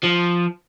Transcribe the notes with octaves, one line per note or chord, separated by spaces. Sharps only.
F3